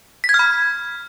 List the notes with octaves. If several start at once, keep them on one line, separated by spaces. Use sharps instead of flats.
B6
G#6
F6
B5